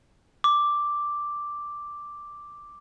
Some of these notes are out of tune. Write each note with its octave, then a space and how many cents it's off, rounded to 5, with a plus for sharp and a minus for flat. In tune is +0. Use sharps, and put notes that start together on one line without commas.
D6 +0